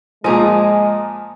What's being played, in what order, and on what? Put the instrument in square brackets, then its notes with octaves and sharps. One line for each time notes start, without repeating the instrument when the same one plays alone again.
[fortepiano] A#2 F3 [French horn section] G#3 [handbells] D#5 D#6 [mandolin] G#5 A#5